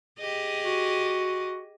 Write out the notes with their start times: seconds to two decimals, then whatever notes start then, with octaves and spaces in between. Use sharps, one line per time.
0.19 G4 G#4 D#5
0.65 F#4